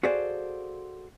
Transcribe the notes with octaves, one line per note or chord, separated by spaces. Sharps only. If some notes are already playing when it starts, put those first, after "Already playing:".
F#4 G#4 A4 C5 D5 F5